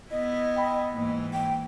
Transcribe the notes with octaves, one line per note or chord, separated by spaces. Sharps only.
B3 E4 D#5
G5 B5
G#2 E3 A#3
G5